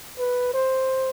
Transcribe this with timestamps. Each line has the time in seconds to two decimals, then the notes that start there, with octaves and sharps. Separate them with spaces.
0.18 B4
0.54 C5